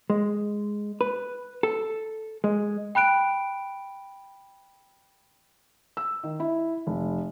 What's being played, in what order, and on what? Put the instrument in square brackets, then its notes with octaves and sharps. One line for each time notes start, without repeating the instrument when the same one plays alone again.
[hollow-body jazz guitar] G#3
B4
A4
G#3
[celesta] G5 B5 F#6 D7
[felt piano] E6
D#3
E4
F1